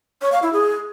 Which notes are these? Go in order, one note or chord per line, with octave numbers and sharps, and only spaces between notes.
C#5
F5
E4
G#4